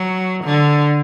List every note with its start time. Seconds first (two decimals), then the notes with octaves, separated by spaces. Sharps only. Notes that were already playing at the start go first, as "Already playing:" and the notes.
Already playing: F#3
0.44 D3